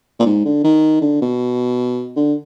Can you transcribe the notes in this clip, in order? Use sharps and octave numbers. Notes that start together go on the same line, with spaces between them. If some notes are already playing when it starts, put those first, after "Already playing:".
A#2
G#2
D3
D#3
D3
B2
D3